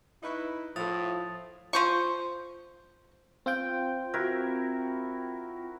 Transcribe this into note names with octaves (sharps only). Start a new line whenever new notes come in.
D#4 E4 B4 C#6
A2 F3 E4 A4 D#6 A6 F7
F3 C5 C#6
C4 F4 G5
E4 F#4 A#4